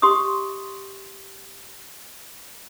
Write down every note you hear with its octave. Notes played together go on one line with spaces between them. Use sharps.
G4 C6 C#6 D#6